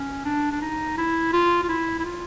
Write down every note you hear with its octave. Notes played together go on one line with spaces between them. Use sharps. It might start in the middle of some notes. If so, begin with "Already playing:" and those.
Already playing: C#4
D4
D4
D#4
E4
F4
F4
E4
E4
F4